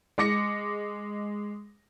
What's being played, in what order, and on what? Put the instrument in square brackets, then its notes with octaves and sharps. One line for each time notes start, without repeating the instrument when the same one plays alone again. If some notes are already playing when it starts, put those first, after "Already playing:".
[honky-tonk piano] G#3 D6 A#6 C#7